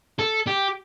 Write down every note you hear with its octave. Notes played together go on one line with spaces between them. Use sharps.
A4
G4